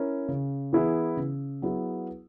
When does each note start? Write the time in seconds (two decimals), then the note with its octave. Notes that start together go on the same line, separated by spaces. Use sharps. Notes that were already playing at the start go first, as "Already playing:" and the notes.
Already playing: C#4 E4 A#4 C#5
0.28 C#3
0.73 E3 B3 E4 G#4
1.17 C#3
1.62 F#3 B3 E4 G#4